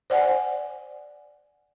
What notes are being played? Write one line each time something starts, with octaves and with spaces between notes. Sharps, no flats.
C5 D5 F#5 G#5